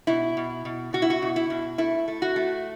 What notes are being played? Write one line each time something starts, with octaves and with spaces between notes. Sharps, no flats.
B2 E4
B2
B2
B2 F#4
E4
F#4
B2
E4
B2
A3 E4
A3
F#4
A3